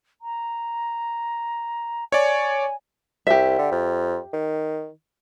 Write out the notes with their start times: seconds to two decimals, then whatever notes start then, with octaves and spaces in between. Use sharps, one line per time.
0.22 A#5
2.12 C#5 D5 G#5
3.27 C2 G4 E5
3.59 D3
3.71 F2
4.33 D#3